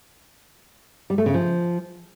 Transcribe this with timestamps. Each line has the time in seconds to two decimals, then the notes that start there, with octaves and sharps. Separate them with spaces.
1.10 G3
1.18 A3
1.26 C#3
1.34 F3